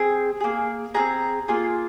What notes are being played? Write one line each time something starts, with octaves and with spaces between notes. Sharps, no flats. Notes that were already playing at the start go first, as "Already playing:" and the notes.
Already playing: C4 G#4
A#3 G#4
C4 F4 G#4 A#5
A#3 F4 G#4